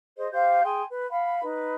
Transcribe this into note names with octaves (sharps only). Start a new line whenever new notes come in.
G#4 C5 D#5
G4 C5 F5 G6
G#4 G5 G#5 C6
B4
F5 F#5 B5
D#4 B4